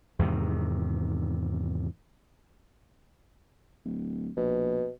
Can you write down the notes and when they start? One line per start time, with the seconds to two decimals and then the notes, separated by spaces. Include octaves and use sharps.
0.19 E2 G#2 C3 D#3
3.85 D1
4.37 A#1 B2